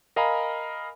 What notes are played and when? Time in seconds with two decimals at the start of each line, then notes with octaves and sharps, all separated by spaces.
0.16 A#4 D#5 F5 G#5 A#5 B5